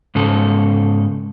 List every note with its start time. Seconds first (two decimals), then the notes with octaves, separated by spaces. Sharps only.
0.15 G#2 C#3 A4